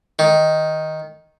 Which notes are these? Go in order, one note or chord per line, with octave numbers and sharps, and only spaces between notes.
D#3